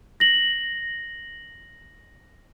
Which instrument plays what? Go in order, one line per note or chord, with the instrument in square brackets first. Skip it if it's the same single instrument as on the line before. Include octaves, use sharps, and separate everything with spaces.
[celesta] A#6 F#7